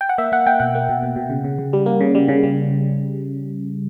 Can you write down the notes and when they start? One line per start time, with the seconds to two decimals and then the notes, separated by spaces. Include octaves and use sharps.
0.01 G5
0.09 F#5
0.18 A#3 E5
0.32 A#3 F#5
0.46 A#3 G5
0.60 B2 F#5
0.75 A#3
0.89 B2
1.03 B2
1.16 B2
1.30 C#3
1.44 C#3
1.59 C#3
1.73 G3
1.86 A#3
2.01 C#3
2.15 G3
2.28 C#3
2.43 G3